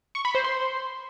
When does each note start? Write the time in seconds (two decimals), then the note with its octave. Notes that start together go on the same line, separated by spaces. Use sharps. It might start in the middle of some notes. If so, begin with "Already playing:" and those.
0.15 C#6
0.25 B5
0.35 C5
0.44 C6